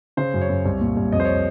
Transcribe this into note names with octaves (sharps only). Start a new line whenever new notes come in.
C#3 C5
F#2
C#5
F#2
C2
A#2
C2
F2 D#5
C5
C#5